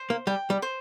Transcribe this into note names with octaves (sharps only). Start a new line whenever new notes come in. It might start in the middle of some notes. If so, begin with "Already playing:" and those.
Already playing: C5
A#3
G3 G5
G3
C5